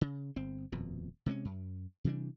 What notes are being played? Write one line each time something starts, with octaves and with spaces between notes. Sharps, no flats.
C#3
G1 C4
D#1 F2 B2
C3 G#3 B3 C#4
F#2
C3 E3 G3 D4